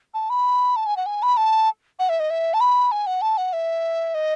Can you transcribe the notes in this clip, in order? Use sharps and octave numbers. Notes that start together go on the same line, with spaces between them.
A5
B5
A5
G#5
F#5
G#5
B5
A5
F#5
E5
D#5
E5
A5
B5
G#5
F#5
A5
F#5
E5
D#5